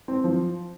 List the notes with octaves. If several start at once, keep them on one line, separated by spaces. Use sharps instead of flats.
C4
F3